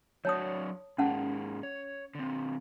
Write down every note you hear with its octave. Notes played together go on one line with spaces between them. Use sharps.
F#3 D4 F#4 C#5 A5 D#6
G#2 G#3 A#3 C#4 F#5 A5
C#5
D3 C4